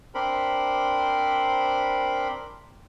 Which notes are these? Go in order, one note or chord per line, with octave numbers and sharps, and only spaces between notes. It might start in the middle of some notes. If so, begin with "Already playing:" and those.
C4 D4 A#4 C5 B5